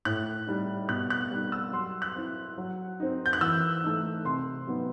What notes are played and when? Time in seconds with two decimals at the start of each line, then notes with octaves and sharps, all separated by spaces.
0.05 A2 F#6
0.47 G3 D#4
0.89 B2 F#6
1.10 F#6
1.31 G3 D#4
1.52 E6
1.73 F#3 C6
2.02 F#6
2.16 C4 E4
2.58 F#3
3.00 C4 D#4
3.26 G6
3.33 F#6
3.41 E3 E6
3.84 A3 D#4
4.25 C3 C6
4.67 F#3 B3 D#4